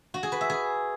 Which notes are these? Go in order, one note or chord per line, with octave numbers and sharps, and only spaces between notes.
F#4
G#4
B4
E5
G#4